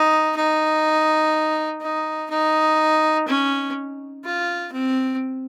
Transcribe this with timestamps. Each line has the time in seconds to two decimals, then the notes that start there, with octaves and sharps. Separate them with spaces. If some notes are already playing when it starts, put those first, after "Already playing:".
Already playing: D#4
0.36 D#4
1.81 D#4
2.30 D#4
3.28 C#4
4.24 F4
4.72 C4